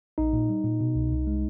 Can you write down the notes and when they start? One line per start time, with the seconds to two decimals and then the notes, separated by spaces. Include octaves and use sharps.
0.18 A#1 D#4
0.33 A#2
0.49 G3
0.64 A#2
0.81 B2
0.95 C2
1.12 C2
1.27 G#3